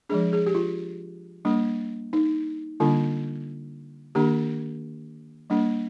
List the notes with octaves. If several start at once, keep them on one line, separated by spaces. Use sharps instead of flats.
F3 G#3 D4 G#4
G#4
G4
F4
G3 A#3 D4
D#4
D3 G3 A#3 D4 F4
D#3 A#3 D4 G4
G3 A#3 D4